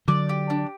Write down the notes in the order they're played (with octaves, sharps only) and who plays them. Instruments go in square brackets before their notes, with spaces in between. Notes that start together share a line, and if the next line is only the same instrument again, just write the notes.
[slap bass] D3 F#3 [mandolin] D5
[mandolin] G4
D4